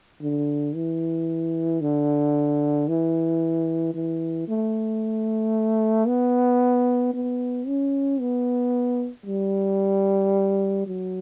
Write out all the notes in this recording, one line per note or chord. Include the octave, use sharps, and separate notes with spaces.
D3
E3
D3
E3
E3
A3
B3
B3
C#4
B3
G3
F#3